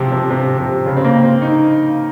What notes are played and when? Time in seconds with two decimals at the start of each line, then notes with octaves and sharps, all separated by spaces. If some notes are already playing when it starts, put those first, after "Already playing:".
Already playing: C3 F3
0.12 C3
0.30 C3
0.58 C3
0.86 C#3
0.97 C4
1.05 A#3
1.23 C4
1.42 D#4